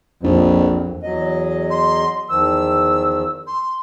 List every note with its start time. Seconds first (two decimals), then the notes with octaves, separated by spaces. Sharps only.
0.24 A#1 F2
1.03 E2 F#3 D#5
1.70 C6
2.29 E2 D#3 F3 E6
3.47 C6